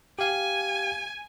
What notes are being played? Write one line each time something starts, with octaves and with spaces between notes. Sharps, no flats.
G4 F5 G#5